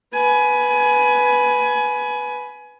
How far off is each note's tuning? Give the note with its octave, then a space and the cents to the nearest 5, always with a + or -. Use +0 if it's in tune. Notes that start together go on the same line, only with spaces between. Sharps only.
B4 +0 G#5 +20